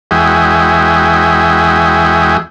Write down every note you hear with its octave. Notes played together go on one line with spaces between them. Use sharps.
E2 G#3 F#4 G#4 E5 G5